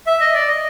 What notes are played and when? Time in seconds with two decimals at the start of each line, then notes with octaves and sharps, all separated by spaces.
0.07 E5
0.20 D#5
0.34 D5
0.47 D#5